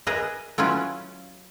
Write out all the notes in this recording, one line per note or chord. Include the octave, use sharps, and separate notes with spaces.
G#4 A#4 B4 D#5 E5
F#3 C#4 E4 F4 B4